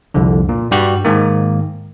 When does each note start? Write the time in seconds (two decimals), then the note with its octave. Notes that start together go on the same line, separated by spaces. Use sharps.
0.14 C2 F2 D3
0.49 A#2
0.71 G2 G3 F#4 G4
1.05 G#2 D#3 A#3